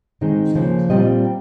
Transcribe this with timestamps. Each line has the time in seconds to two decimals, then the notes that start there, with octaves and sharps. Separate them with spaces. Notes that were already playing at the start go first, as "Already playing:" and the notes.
0.21 D#3 G#3 C4 D#4
0.55 C#3 F3 A#3
0.89 A#2 G3 C4 F4 D#5